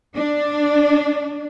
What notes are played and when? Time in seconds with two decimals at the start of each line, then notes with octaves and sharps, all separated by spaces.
0.15 D4